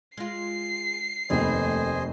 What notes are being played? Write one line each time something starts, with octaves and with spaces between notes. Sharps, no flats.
G#3 F4 C7
F1 D#2 A3 B3 C5 D#5 G#5